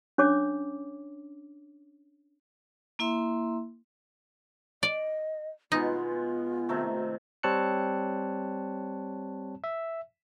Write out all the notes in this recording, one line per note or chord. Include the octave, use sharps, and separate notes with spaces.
C#4 D4 C#5 D6
A#3 E4 E5 C6
D5 D#5
B2 G#3 B3 D#4 F4
C3 D#3 A3
G3 C4 C#5 A5 F#6 C#7
E5